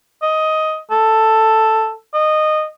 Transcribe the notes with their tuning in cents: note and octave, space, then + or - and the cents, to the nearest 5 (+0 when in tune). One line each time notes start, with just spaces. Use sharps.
D#5 +10
A4 +5
D#5 -15